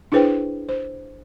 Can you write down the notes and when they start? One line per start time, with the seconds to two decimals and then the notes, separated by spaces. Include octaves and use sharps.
0.12 D4 E4 G#4 B4 C5 G5
0.69 C5